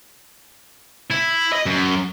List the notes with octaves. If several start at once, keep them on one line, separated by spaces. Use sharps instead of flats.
E4
D#5
F#2